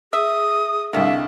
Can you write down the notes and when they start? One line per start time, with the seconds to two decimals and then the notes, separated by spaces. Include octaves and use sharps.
0.13 G#4 E5 D#6
0.93 C2 D3 D#3 A3 E5 F5